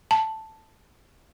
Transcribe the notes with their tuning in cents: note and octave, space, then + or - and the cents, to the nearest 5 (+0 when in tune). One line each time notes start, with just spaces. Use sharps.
A5 +0